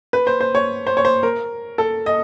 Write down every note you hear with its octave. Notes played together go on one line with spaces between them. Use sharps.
B4
C5
C5
C#5
C5
C#5
C5
A#4
A4
D#5